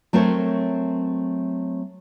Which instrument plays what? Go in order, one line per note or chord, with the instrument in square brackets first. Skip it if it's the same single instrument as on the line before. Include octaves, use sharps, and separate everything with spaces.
[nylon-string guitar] F#3 A3 C4 A#4 C5 C#5